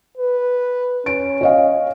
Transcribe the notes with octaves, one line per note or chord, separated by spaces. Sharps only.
B4
C#4 D7
C#5 D#5 F5